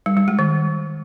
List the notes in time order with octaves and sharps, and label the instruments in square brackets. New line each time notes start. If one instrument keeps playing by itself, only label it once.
[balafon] G3
G3
G#3
D#3